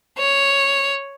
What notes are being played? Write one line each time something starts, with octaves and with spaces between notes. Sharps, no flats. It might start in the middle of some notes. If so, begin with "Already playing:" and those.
C#5